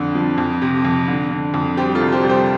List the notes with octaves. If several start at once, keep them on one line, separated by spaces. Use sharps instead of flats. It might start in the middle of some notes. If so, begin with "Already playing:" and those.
Already playing: F2 D3 A4
F3
F2
C3
F2
D3
D3
F2
G3 G4 C5
F4 A4
C2
G4 C5
G3
G4 C5